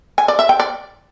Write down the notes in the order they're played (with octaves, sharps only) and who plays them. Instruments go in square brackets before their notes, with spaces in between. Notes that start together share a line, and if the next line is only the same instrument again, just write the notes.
[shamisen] G#5
D5
E5
G5
D5